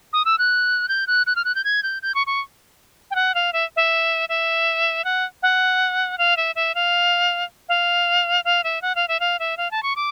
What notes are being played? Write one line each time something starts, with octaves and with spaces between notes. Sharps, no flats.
D#6
E6
F#6
G6
F#6
F#6
F6
F#6
G6
G#6
G6
G6
C#6
C#6
G5
F#5
F5
E5
E5
E5
F#5
F#5
F5
E5
E5
F5
F5
F5
E5
F#5
F5
E5
F5
E5
F5
A5
C#6
D6